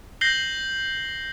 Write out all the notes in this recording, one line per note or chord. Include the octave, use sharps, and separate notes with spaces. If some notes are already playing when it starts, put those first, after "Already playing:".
G6 A#6 C7 F#7 G7